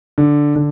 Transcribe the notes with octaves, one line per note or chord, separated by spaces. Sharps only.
D3
D3